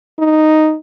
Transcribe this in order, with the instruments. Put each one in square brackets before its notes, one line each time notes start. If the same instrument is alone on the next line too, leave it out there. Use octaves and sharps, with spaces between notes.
[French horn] D#4